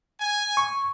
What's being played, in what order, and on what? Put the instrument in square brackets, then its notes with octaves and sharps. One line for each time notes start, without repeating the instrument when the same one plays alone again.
[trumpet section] G#5
[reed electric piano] C#6